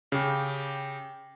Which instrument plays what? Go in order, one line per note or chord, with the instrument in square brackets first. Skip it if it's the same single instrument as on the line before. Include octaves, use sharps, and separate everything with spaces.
[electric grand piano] C#3 [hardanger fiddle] G4